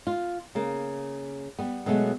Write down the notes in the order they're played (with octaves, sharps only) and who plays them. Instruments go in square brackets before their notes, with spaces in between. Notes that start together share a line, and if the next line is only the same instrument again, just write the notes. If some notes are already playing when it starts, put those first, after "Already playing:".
[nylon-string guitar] F4
C#3 A#3
G3 B3
B2 F#3 G#3 A3 B3